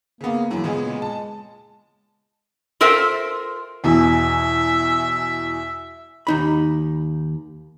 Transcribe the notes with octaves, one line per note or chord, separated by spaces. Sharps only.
C#3 A#3 B3
F#2 E3
A#2 C#3 G#3 B3
A5
F4 A4 A#4 C5 E5 G5
E2 B2 E3 E5
D#2 D#4 B5